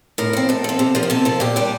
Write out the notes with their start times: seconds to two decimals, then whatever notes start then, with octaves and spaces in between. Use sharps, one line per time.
0.18 A2 A#4
0.33 F3 C4
0.49 A2 A4
0.64 F3 C4
0.79 C3
0.95 F3 A#3 C5
1.03 A#4
1.10 C3 A4
1.25 F3 A#3
1.40 A#2 G4
1.56 G3 D4